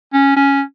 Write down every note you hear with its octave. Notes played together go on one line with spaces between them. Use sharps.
C#4
C#4